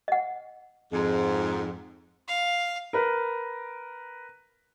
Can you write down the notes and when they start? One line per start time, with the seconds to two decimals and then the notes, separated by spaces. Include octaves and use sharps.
0.08 D#5 F#5
0.92 F2 G#2
2.28 F5
2.93 A#4 B4